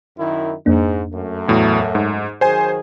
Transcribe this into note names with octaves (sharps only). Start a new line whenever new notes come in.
F#2 D#3 E4
F2 G#2 A#3 D4
F#2 A3
E2 A2 F#3
G#2
D#3 F#3 G#4 C5 G#5